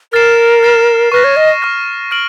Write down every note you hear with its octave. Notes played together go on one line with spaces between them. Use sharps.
A#4 F6 A6 C7 E7
F6 A6 C7 E7
B4 C#6 F6 A#6
C#5
D#5
C#6 F6 A#6
F6 A#6 D7 F#7